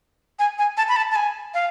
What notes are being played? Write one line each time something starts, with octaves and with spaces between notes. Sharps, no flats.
G#5
G#5
A5
B5
A5
A5
G#5
F5